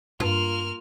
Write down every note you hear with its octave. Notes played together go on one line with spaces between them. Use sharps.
G2 A#3 F4 F6